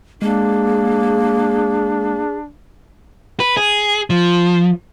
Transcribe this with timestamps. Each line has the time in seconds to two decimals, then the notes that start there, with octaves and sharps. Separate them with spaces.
0.22 G#3 A#3 D4 G#4
3.40 B4
3.57 G#4
4.10 F3